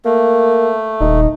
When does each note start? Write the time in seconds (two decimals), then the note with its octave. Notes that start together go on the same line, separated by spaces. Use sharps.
0.05 A3 A#3
1.01 D#1 D#4